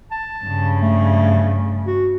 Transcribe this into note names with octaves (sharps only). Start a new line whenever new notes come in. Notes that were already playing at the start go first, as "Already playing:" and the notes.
A5
G2 C#3
A3
F#4